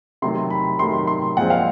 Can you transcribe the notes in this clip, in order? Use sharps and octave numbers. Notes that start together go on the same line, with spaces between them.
C3 D#3 F#3 A3 C6
B5
C3 D#3 F#3 A3 C6
C6
A#2 F3 G#3 C4 F#5
F5